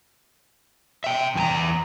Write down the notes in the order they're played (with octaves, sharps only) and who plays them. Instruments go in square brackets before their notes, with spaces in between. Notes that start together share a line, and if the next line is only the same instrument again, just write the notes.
[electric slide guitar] E5 G5
E2 G#5 A#5